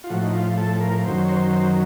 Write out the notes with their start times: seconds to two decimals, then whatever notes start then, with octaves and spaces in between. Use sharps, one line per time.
0.04 F4
0.10 A2 F3 F#4
0.22 D#4
0.33 F4
0.57 A4
0.80 A#4
1.05 F#2 D#3 F#3 C5
1.25 C#5
1.28 C5
1.52 C5